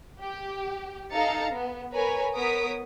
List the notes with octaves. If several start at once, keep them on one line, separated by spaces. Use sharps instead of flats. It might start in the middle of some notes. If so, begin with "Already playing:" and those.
G4
D#4 A4 F5 A#5 A6 C#7
B3
A#4 B4 C#5 G#5 A#5 B5
B3 A#4 C#5 D#6 B6 D7